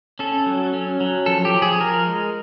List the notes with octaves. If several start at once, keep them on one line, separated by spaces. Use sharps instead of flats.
C#4 A4
F#3
C#4
F#3
F3 A4
G4
F3
G#4
F3 A#4
G#3